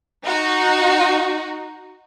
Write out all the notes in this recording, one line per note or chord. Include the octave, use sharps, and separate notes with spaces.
D#4 F#4